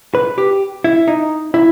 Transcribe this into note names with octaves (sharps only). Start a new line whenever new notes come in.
B4
G4
E4
D#4
E4